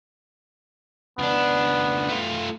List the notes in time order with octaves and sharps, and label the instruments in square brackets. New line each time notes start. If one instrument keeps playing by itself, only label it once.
[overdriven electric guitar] C#2 D4 [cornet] B3
[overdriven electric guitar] A3 F4